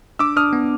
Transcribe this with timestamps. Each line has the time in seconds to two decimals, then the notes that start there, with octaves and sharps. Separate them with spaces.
0.19 D4 D6 E6
0.36 D4 D#6 F6
0.53 B3